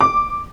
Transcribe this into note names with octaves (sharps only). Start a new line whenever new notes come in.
D6